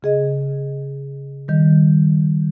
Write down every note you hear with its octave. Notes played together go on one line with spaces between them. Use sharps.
C#3 G#4 D#5
D#3 G3